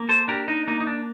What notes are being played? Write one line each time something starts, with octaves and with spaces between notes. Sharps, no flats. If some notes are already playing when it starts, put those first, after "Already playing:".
Already playing: A#3
A4 C5
D4 G4 A#4
D#4
A#3 D#4
D#4
D4